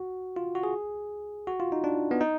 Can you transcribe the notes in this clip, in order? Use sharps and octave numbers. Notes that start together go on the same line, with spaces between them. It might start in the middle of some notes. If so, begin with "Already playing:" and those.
Already playing: F#4
F4
F#4
G#4
F#4
F4
D#4
D4
B3
D#4